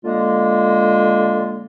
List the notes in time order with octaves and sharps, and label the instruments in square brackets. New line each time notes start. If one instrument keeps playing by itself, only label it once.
[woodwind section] D3 G#3 A#3 F4